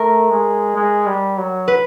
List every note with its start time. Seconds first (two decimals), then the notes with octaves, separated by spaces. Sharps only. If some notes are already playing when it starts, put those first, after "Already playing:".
Already playing: A3 A#4
0.30 G#3
0.76 G#3
1.06 G3
1.37 F#3
1.68 B4